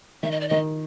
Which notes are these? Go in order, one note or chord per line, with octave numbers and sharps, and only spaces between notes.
D#3 E5
D#5
D5
D#3 D#5